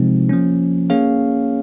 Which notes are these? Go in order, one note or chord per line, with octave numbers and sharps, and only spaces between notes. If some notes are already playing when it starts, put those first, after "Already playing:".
Already playing: C3 F3 G#3 C4 D#4
F3 A#3 C#4
A#3 C#4 G#4 C#5 F5